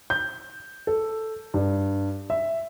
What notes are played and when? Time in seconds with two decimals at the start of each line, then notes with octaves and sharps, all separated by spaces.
0.10 G6
0.87 A4
1.54 G2
2.30 E5